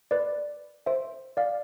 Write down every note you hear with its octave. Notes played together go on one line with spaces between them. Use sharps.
B4 D5
C5 E5
D5 F5